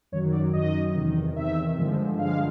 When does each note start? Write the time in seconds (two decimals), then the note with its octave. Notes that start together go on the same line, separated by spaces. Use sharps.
0.12 F#2 D#3 F#3 C#5
0.33 D5
0.53 F#2 D#3 F#3 D#5
0.95 E2 C3 D#3
1.36 E2 C3 D#3 E5
1.78 G2 D3 F3 G#3
2.19 G2 D3 F3 G#3 F5